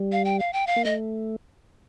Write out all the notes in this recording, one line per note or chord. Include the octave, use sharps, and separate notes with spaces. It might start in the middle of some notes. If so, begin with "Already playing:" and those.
Already playing: G3
F5
G5
F5
G5
F5
A#3
A3 D#5